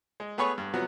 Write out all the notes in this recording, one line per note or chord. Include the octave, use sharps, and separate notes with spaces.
G#3
A3 B3 G#4 B4 C#5 C#6
G2
C3 F3 F#3 B3